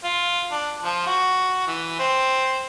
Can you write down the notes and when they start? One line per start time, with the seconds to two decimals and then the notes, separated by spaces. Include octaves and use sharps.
0.04 F4
0.51 D4
0.83 F3
1.06 F#4
1.67 E3
1.99 C4